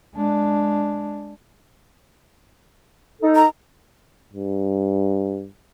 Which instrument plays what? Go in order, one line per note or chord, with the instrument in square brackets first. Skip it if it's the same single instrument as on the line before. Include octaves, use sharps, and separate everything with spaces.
[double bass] G#3 D4
[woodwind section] D#4 A4
[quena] A#5
[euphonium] G2